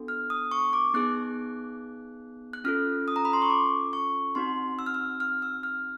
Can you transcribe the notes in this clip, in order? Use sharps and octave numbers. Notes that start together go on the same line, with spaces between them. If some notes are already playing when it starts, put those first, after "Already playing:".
Already playing: B3 D4 F#4 A4
F6
D#6
C#6
D6
B3 D#4 G#4 F#6
F#6
C#4 F4 A4 F6
D#6
A#5
B5
C6
C#6
D6
C#6
C4 D#4 F#4 C6
E6
F6
E6
F6
E6
F6